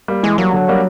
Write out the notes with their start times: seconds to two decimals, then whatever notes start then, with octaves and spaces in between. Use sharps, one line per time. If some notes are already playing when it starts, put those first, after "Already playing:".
0.08 G3 A#3
0.23 E3 G#3
0.38 F#3 G3 A#3
0.53 D3
0.68 G3 A#3 D4 F#4